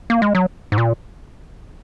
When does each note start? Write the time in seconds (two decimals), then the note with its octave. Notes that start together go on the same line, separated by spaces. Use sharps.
0.10 A#3
0.22 G#3
0.35 F#3
0.72 G#2
0.78 A#2